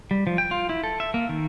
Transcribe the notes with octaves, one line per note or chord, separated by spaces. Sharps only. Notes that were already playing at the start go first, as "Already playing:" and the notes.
G3
F3
G5
F4
E4
A4
E5
A#3
D#3